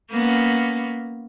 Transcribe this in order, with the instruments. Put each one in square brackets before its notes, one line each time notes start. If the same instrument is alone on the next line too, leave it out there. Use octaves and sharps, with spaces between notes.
[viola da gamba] A#3 B3 C#4